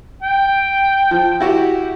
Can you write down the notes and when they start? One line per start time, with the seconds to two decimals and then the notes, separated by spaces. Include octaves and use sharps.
0.23 G5
1.11 F3
1.40 E4 F#4 G4